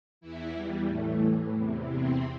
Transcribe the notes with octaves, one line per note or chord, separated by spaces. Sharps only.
E2 E3 E4
G3
A2 E3 A3
E2 C3 E3
C4